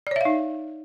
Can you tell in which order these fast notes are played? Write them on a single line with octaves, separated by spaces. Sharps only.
D5 C#5 E5 F5 D#4